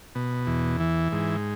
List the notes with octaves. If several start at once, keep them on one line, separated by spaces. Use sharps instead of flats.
B2
E2
E3
G#2